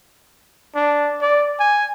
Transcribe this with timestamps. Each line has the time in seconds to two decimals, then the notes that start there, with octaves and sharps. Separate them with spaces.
0.75 D4
1.21 D5
1.59 G#5